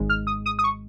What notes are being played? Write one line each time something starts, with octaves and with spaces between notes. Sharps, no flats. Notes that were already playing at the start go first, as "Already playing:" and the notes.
Already playing: G#1 G#2 G#3
F6
D#6
D#6
D#6
C#6